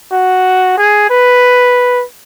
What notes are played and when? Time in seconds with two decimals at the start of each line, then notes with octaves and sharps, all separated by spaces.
0.12 F#4
0.78 G#4
1.10 B4